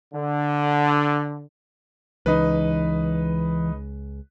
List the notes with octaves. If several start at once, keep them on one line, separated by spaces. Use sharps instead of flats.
D3
C#2 E3 D#4 B4